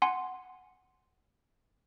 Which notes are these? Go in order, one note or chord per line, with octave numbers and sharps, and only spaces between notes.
F#5 G#5 C6